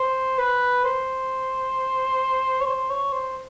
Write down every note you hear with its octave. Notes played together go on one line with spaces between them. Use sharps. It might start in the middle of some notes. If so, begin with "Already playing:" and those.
Already playing: C5
B4
C5
C#5
C5
C#5
C5